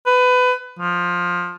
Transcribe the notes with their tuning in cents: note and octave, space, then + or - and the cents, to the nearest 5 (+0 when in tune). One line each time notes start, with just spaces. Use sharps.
B4 +20
F3 +15